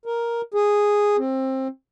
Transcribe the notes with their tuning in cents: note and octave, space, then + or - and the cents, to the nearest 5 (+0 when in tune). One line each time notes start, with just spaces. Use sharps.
A#4 +5
G#4 -5
C4 +20